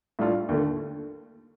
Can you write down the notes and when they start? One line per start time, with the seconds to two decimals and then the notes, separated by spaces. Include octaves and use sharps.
0.19 A2 G3 D4 F4 A4
0.49 D#2 D3 A3